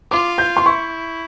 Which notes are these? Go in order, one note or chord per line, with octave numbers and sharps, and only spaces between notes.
F4 D6
G6
C6
E4 C#6